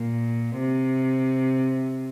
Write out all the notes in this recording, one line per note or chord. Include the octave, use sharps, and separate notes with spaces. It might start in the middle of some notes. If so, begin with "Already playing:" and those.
Already playing: A#2
C3